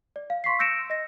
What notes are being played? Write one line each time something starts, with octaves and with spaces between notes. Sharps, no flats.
D5
F5
C6 C#6 B6 C7
E6 G6 A#6 C#7 D7 E7
D#5 A#6